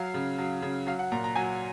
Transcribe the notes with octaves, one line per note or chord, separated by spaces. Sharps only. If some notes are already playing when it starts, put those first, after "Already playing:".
Already playing: F#3 F5
C#3
F#3
C#3
F#3 F5
F#5
A#2 A#5
A#5
F#3 G#5